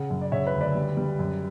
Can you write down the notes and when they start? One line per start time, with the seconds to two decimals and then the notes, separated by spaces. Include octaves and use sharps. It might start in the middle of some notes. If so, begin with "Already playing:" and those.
Already playing: C#3 F#5
0.10 F#2
0.21 D5
0.32 C#3 C#5 E5
0.47 B4
0.53 D2
0.61 B4 D5
0.75 G3
0.97 G3
1.19 F#2